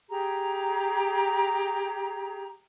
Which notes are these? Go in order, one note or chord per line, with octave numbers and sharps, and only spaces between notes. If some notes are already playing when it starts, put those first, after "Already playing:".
G4 G#4 A#5